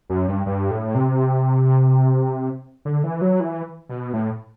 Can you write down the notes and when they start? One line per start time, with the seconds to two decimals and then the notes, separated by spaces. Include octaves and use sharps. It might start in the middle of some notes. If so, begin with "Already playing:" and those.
0.10 F#2
0.28 G2
0.46 G2
0.71 A2
0.95 C3
2.85 D3
3.04 E3
3.21 F#3
3.40 E3
3.89 B2
4.13 A2